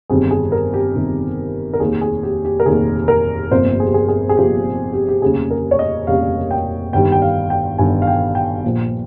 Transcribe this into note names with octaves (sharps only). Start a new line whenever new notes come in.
G1 F2 C3 D#3 G3 G#4
G#4
A#4
G4
G1 F2 C3 D#3 G3
A#4
F1 D#2 D#3 A#3 G#4
G#4
G4
G4
A#4
F1 D#2 D#3 A#3 G#4
A#4
G1 F2 C3 F3 A#3 C5
G#4
G4
G#4
G#4
G#4
G1 F2 C3 F3 A#3 G4
G4
G4
F1 D#2 C#3 G3 G#4
A#4
C#5
D#5
F1 D#2 C#3 G3 F5
G5
G1 G2 D#3 G3 G5
G5
F5
G5
G1 G2 D#3 G3 G#5
F5
G5
G5
A#1 A#2 F3